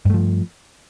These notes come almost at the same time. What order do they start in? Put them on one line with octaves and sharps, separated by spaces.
G2 A3 F3